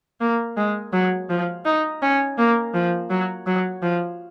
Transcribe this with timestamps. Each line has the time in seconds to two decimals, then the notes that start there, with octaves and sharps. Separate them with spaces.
0.21 A#3
0.57 G#3
0.93 F#3
1.30 F3
1.65 D#4
2.02 C#4
2.38 A#3
2.74 F3
3.10 F#3
3.47 F#3
3.82 F3